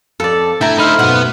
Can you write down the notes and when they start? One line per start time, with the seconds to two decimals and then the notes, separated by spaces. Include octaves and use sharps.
0.20 F2 A4 D5
0.61 D3 A3 E4 G5 A#5
0.78 D#4 C5 E5 F5 B5
0.99 F#2 B2 B4 F#5